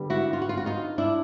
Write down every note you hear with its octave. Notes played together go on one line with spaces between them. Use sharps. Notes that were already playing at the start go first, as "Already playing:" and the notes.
Already playing: D3 G3 B3
E4 F#4
F4
F#4
F4
F#4
D#4 F4
D4 E4